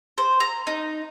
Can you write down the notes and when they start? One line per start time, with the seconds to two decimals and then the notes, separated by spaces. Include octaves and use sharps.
0.18 C5
0.40 A#5
0.67 D#4